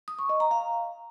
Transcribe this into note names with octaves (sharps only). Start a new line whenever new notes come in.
D#6
C#6
D#5
A#5
F5